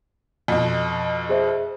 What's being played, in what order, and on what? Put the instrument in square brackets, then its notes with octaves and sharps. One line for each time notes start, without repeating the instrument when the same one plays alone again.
[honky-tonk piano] F2 B2
[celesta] G#4 C5 E5